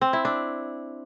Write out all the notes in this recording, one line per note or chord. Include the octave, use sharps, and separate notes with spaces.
C4
E4
D4